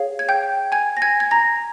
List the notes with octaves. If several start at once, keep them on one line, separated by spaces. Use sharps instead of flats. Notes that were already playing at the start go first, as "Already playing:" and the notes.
Already playing: G#4 C#5 F5
G#6
G5 G6
G#5 G#6
A#6
G#5 G#6
G#6
A#5 A#6